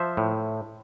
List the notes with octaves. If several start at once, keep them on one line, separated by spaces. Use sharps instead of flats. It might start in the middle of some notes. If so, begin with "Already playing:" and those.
Already playing: F3 C5 E5
A2